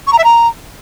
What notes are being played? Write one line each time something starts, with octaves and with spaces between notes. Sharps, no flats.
C#6
A#5
E5
A#5